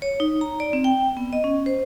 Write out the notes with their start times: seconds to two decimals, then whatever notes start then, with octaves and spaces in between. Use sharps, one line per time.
0.02 C#5
0.20 D#4
0.41 A#5
0.60 D5
0.73 C4
0.84 G5
1.17 B3
1.33 D#5
1.44 C#4
1.66 C5